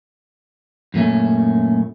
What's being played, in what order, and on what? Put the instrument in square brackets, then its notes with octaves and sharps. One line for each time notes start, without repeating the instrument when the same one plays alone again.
[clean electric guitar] F#2 A#2 A3 C#4